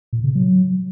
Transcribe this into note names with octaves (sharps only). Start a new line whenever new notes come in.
A#2
C#3
F#3